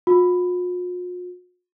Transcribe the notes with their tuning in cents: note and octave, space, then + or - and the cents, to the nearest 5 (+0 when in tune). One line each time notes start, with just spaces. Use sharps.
F4 +45